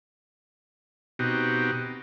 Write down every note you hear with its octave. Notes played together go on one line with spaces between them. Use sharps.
B2 C4 D#4 F#4 G4